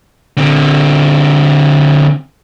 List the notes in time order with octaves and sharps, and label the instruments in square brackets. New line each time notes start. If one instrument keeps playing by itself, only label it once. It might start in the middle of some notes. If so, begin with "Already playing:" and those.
[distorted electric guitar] D3 C4